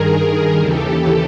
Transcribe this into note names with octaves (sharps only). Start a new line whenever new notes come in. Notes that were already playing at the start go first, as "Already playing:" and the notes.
Already playing: G2 D#3 G#4 A#4
D#2 C#3 E3 G4 A4